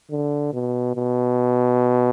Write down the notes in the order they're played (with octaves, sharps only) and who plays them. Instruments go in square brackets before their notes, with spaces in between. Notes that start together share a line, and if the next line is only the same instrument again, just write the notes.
[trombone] D3
B2
B2